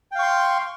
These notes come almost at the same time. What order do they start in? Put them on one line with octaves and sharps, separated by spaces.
G5 F5 C#6 C6